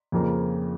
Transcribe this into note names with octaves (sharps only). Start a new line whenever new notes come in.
F2 C#3 F3 A#3